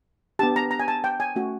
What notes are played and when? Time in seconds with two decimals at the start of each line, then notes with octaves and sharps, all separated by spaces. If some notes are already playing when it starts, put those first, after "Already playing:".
0.39 B3 D4 G4 A5
0.56 A#5
0.71 A#5
0.80 G#5
0.88 A5
1.04 G5
1.20 G#5
1.36 A3 C#4 F#4